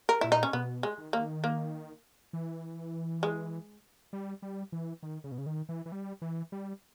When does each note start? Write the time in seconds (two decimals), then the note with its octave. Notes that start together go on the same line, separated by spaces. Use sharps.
0.09 A#4
0.21 A#2 E4
0.32 D#4
0.43 C#4
0.53 B2 B3
0.83 G#3
0.98 D#3
1.13 A#3
1.44 A#3
2.33 E3
3.23 G#3
4.13 G3
4.42 G3
4.72 E3
5.03 D#3
5.24 C#3
5.32 B2
5.38 C#3
5.46 D#3
5.69 E3
5.86 E3
5.92 G3
6.22 E3
6.52 G3